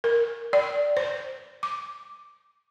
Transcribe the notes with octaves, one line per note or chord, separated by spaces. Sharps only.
A#4
D5
C5
D6